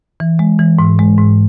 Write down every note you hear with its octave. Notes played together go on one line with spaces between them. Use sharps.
E3
G#3
E3
G#2
G#3
G#2